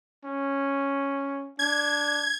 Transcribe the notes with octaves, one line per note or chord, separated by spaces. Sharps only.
C#4
D4 G#6